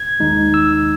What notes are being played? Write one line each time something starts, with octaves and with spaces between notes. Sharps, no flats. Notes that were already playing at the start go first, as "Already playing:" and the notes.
Already playing: G#6
D#2 D#3 G#3 D#4
E6